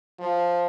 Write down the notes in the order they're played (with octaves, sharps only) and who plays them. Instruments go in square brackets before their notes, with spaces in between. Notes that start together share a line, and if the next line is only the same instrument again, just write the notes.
[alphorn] F3